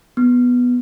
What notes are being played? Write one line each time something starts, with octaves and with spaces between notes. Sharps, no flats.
B3